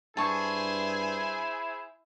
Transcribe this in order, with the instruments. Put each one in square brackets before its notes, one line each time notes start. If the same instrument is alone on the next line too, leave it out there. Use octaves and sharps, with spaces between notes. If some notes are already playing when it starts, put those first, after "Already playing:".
[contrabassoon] G2 [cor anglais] E4 [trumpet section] G#4 C5 G#5 [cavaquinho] A5 C#6